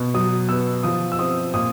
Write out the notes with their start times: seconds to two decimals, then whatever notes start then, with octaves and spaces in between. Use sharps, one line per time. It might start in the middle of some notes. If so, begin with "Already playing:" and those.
Already playing: B2
0.14 F#3 D#6
0.49 B3 E6
0.83 F3 D#6
1.12 E6
1.19 C4 D#6
1.54 A#2 D#6